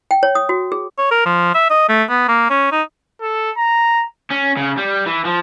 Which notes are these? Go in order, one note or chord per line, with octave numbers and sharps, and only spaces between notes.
G5
C#5
D#6
F#4
G#4
C#5
A#4
F3
E5
D#5
A3
B3
A#3
C#4
D#4
A4
A#5
C#4
C#3
G3
E3
F3